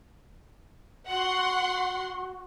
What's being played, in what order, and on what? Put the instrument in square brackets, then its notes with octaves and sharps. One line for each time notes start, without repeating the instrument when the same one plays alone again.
[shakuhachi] F#4 [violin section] F#5 C6